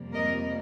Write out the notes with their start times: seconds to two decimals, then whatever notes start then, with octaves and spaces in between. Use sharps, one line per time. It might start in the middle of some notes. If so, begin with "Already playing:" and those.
Already playing: F2 C3 G3 A#3
0.14 A#4 D#5